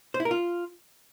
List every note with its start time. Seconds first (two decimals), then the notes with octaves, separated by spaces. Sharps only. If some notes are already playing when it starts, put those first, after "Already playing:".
0.14 C5
0.20 E4
0.25 A#4
0.31 F4